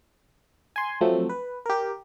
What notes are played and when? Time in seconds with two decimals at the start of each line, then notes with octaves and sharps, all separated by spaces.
0.76 G#5 C6
1.01 F3 F#3 A3 C4
1.29 B4
1.66 G4 A#4